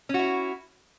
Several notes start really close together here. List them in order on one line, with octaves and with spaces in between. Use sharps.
C#4 F#4 E4